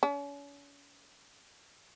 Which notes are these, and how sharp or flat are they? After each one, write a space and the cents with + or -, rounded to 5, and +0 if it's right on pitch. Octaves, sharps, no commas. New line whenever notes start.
C#4 +40